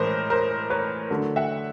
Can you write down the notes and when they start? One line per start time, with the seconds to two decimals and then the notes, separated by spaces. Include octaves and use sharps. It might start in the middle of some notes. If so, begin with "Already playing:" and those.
Already playing: A2 E3 G#3 A#4 C5
0.30 A#4 C5
0.70 B4 C#5
1.10 D3 F#3 A3
1.36 E5 F#5